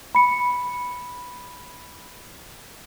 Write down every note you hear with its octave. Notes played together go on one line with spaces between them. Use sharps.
B5 C#7